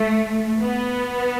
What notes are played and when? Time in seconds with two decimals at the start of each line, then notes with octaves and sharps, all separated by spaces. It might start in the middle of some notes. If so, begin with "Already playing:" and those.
Already playing: A3
0.62 B3